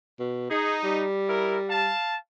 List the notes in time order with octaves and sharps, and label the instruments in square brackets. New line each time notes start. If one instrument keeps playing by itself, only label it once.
[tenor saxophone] B2
[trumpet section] D#4 [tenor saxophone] G#4
[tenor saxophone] G3
[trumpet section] E4 A#4
F5 A5